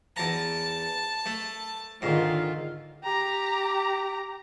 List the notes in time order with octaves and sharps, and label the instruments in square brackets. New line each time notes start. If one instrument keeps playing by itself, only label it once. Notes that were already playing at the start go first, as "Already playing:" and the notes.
[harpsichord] E2 A#5 [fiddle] A5
[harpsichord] A3
[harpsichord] G#2 [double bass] D3 D#3 [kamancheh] F4
[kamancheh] G4 A#5